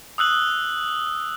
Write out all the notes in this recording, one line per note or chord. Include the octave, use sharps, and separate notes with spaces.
D#6 E6 F#6 F#7